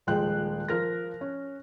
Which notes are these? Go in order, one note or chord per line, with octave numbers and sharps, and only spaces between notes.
D#1 F3 G#3 G5 F#6
F3 A#4 A#6
C#4